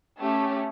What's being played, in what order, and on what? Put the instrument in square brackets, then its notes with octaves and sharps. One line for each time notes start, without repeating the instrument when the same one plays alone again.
[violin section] A3 C#4 G4